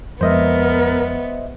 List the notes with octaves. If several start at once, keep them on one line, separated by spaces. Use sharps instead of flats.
F2 F3 G#3 B3 A#4 C5 D#5 E5